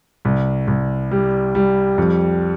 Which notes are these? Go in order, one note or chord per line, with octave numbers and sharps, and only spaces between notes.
C2
C2
G3
G3
F2